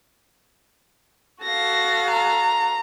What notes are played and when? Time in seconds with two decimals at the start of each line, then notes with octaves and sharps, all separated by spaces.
1.43 F#4 A4 F5 A#6
2.10 A#5